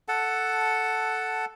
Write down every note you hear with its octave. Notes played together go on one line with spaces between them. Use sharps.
A4 F#5 A5